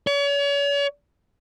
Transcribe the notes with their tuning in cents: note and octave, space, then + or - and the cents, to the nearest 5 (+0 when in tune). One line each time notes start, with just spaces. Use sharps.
C#5 +40